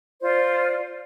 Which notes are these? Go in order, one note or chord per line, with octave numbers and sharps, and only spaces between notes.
F4 C5 D5